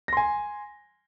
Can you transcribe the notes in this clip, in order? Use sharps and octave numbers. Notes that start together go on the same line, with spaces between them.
G#5 C6 A#6